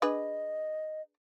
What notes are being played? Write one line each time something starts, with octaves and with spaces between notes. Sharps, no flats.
D4 G#4 B4 D#5